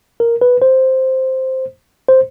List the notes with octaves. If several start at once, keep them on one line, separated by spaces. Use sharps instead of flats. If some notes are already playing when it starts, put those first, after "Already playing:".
A#4
B4
C5
C5